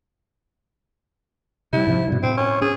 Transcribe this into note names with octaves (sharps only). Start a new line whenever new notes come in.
C3 G3 E4
G#2 C3 F3
G2 B2
A2 C4
C#4
C#4 G#4